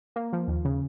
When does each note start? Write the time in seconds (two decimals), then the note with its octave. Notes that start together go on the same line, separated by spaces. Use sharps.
0.16 A#3
0.33 F3
0.48 D#2
0.65 C#3